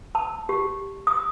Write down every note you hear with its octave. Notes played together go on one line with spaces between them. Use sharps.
A5
G4
D#6